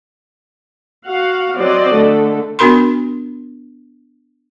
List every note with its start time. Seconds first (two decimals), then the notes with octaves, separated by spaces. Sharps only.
1.07 F#4 F5 F#5
1.56 F#3 C4 F#4 C5 D5 D#5
1.94 D3 A3 A4
2.59 B3 D4 F#4 A#4 B5 C6